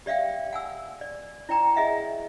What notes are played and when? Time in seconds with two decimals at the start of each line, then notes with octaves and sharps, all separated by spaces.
0.06 G4 D5 E5 F5 G5
0.53 F#5 G#5 E6
1.01 D5
1.49 E4 D5 G5 A#5
1.76 G#4 D#5 E5 F#5